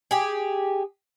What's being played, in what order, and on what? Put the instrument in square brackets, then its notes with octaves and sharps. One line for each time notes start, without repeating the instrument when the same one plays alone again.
[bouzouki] G4 G#4